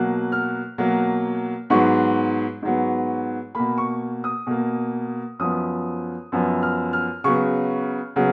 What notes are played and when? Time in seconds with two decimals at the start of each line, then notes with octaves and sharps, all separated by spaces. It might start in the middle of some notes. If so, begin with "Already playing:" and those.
Already playing: B2 F#3 A#3 F#6
0.32 F6
0.78 B2 F#3 A#3
1.70 G#2 F#3 B3 C#6
2.62 G#2 F#3 B3
3.55 B2 A#3 B5
3.78 C#6
4.24 D#6
4.47 B2 A#3
5.39 F#2 F3 B3 D#6
6.32 F#2 F3 B3
6.62 F6
6.93 F6
7.24 C#3 F#3 B3 C#6
8.16 C#3 F#3 B3